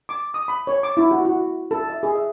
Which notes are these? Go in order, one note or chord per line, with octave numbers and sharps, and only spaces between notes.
D6
D#6
B5
C#5
D6
E4
F#4
F#4
A4
E5
G#4
E5